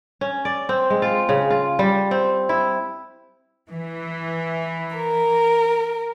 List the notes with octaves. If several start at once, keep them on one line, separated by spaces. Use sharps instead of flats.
C#4
D5
C4
G#3
F4
C#3
F4
G3
C4
E4
E3
A#4